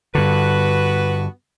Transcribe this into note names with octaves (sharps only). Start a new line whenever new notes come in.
G2 D3 B3 F#4 B4